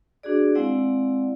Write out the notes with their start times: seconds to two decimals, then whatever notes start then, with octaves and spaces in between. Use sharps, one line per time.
0.23 D4 F#4 G#4 D5
0.55 G#3 C4 E4 D5 F5 F#5